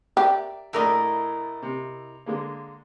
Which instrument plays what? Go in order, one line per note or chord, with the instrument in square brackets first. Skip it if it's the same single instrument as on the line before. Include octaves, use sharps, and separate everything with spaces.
[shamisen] G4 [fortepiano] A#4 D5 E5
[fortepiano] A#1 A3 D5 [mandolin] E4 A#4 D#5
[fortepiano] C3
D3 G#3 A#3